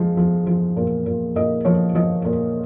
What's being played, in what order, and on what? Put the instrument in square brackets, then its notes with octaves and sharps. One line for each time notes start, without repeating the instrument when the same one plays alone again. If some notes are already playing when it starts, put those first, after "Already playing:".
Already playing: [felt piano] F3 G#3
F3
F3
A#2
A#2
A#2 D#5
F3 C#5
F3 D#5
A#2